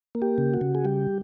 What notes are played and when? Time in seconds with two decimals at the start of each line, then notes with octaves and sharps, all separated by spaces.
0.15 A#3
0.22 G4
0.38 C#3
0.54 F#4
0.61 C#3
0.75 G#4
0.85 G3 G4